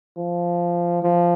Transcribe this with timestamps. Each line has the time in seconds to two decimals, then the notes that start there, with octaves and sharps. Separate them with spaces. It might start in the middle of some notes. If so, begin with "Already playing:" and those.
0.17 F3
1.02 F3